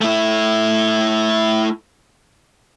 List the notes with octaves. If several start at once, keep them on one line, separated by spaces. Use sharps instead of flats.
A3 E4